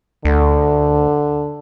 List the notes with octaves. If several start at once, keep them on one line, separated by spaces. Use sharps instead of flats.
D2 D3